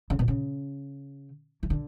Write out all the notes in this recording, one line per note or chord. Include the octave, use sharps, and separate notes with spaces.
C#3
B2
C#3
E3
D3